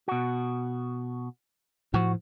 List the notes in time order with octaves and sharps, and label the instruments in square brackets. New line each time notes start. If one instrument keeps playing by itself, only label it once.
[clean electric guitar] B2 F#4
[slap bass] A2 F3 [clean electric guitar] F#4